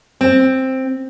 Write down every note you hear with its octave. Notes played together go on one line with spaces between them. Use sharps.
C4